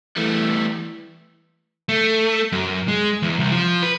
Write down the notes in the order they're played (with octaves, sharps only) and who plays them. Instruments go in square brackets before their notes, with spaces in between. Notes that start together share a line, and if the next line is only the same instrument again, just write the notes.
[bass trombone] E3 [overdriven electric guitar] G3 A3
[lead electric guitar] A3
F#2
G#3
E2
C2
F3
B4